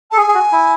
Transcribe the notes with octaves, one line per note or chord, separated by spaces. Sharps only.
A5
A4
G#4 G#5
G#4
F#4
E4